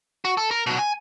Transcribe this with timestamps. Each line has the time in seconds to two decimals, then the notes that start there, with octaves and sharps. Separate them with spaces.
0.25 F#4
0.37 A4
0.51 A#4
0.67 B2 F#3
0.78 G#5